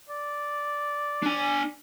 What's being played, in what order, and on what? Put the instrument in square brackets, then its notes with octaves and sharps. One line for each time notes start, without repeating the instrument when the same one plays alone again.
[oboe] D5
[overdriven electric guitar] D4 G#5